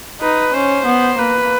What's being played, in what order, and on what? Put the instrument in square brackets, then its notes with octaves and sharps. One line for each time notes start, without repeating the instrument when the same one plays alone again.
[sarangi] D#4 [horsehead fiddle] B4
[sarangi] C#4 [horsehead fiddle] C5
[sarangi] B3
[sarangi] A#3 [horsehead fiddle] B4